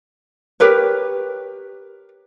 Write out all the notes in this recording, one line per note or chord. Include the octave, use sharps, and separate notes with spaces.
G4 A#4 B4 C#5